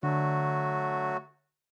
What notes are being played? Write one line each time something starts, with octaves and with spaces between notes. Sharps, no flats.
D3 F#3 A3 F#4